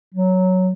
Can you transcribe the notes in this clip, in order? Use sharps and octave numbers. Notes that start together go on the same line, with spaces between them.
F#3